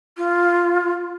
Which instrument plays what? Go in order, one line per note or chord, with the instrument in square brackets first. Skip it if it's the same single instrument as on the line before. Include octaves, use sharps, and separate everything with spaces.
[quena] F4